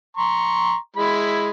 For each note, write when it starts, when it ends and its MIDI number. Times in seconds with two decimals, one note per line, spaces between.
0.17 0.76 82
0.17 0.76 84
0.17 0.76 85
0.96 1.51 56
0.96 1.51 64
0.96 1.51 83